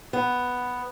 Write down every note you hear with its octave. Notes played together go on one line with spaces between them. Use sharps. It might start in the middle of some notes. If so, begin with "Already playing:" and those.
B3